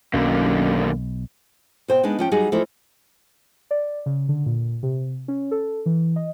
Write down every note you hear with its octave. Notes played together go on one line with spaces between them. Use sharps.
B1 F#2 D3 D#3 A#3
B2 C5 G5
G#3 B3 D4 D#4
F3 C#4 G5
F#3 G3 D#4 F#4 G#4
E3 F3 A3 D#4 E4
D5
C#3
D3
A#2
C3
C#4
A4
E3
D#5